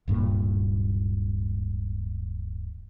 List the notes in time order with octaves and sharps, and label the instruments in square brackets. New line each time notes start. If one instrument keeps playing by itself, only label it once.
[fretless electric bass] D1 G2 A#2 A#3